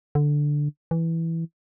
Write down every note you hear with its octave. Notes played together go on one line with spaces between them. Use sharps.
D3
E3